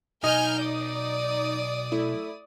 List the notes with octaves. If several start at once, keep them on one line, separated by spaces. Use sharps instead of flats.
B1 D#4 D#5 G#5 F6 G6
D5 D#6
A3 E4